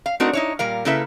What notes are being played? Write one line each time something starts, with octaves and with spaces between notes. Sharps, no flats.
F5
A3 C4 D4 D#4 F#4 A#4
D#4 E4 C#5
A#2 G3 A#4 F5
C#3 A#3 E4 A4 B4 E5